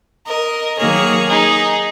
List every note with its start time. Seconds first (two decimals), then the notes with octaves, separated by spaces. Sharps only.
0.27 A#4 D#5
0.78 D#3 F#3 A#3 G#4 C#5
1.29 D#4 G#4